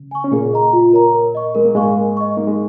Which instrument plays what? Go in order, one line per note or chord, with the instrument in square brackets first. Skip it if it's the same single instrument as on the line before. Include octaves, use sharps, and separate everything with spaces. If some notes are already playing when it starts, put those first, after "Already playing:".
Already playing: [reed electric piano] C#3
[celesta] G#5 C#6
[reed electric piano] C#4
[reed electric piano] A#2 A#3 [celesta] G#4
[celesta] D#5 A#5
F4
A#4 C#5 A#5
A#4
D#5 C#6
[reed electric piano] G#3 [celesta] A#4
[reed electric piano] A#3
[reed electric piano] G#2 G#3 [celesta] F5 G#5 C#6
[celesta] A#4
D#5 C#6
[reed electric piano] A#3 [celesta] D#4
[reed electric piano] G#3